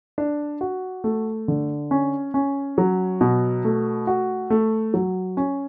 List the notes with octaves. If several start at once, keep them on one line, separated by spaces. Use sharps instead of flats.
D4
F#4
A3
D3
C#4
C#4
F#3
B2
A3
F#4
A3
F#3
C#4